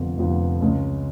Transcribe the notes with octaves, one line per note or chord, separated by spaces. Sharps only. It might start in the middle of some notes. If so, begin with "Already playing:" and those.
Already playing: F1 F2 D3 F3 B3
F1 F2 D3 F3 B3
C#2 C#3 G#3 C#4